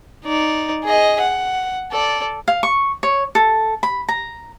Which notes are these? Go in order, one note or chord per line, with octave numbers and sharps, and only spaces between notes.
D#4 D5
G#4 D#5
F#5
A4 D5
F5
C#6
C#5
A4
B5
A#5